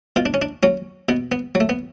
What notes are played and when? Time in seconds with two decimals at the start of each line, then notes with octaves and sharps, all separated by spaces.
0.16 B2 F4
0.26 D4
0.34 C#4
0.42 D4
0.63 F#3 C#4
1.09 B2 B3
1.32 B3
1.55 F#3
1.60 A3
1.69 B3